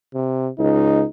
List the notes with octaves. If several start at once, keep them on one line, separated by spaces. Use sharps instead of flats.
C3
C#2 D#4